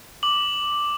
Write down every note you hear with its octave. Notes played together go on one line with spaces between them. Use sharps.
D6 F#7